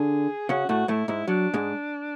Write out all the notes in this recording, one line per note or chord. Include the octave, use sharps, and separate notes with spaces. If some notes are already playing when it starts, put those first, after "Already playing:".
Already playing: D3 D4 G#4
C#3 C#4 F#4
A2 A3 F#4
A2 A3 E4
G#2 G#3 E4
F#3 D4
G#2 G#3